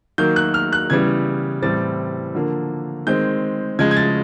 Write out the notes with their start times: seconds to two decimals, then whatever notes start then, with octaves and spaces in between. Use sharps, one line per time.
0.18 D#3 F#3 A#3 G6
0.36 F#6
0.54 F6
0.73 F#6
0.90 C#3 E3 G3 B3 G#6
1.62 A2 E3 G3 C4 A6
2.35 D3 F3 A#3
3.07 D#3 G#3 C4 G6
3.79 C#3 F3 G#3 G#6
3.91 G#6
3.97 A6